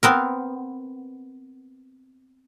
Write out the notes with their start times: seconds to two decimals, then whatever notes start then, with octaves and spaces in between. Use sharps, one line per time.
0.03 B3 C4 A#4